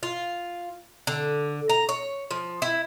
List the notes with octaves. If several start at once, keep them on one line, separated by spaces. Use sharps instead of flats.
F4
D3
A#5
C#5
F3
E4